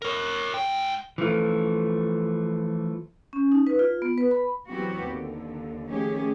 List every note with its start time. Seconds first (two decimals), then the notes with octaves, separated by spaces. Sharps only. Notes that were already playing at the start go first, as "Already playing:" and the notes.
0.02 A#4 C#5
0.54 G#2 G5
1.18 E3 F3 A3
3.33 C#4
3.52 D#4
3.67 B4
3.79 F4
4.02 B3
4.18 B4
4.31 B5
4.70 E3 F#3 B3 C4 F#4 G4
5.05 D#2 D3
5.88 D#3 F3 A3 C#4 G4 G#4